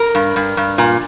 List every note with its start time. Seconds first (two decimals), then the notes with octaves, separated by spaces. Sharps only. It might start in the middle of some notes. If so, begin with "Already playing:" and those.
Already playing: A#4
0.15 G2
0.36 G2
0.57 G2
0.78 A#2